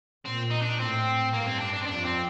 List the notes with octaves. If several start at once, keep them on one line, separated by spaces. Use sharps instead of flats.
A#2 C4
D#4
D4
A2 C4
G2 A#3
C4
D4
D4
C4
F2 D4
C4